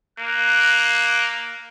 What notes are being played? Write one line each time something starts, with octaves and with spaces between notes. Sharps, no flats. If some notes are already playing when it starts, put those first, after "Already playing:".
A#3 F#6